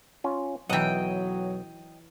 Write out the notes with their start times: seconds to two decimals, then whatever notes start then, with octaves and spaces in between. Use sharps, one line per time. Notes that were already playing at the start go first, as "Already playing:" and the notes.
0.24 C#4 F4
0.69 B1 E3 F#3 D#5 F#5 G5